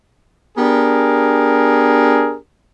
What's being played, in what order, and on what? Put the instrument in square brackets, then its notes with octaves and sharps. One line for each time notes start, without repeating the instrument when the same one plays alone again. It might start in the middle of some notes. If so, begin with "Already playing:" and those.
[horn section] B3 D4 G4 G#4 A#4